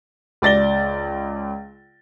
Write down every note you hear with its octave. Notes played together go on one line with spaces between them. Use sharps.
C#2 D5 A6 A#6 G7